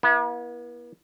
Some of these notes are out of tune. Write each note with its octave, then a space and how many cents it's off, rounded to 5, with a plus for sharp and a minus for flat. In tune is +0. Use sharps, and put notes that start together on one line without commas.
B3 -45 E4 +0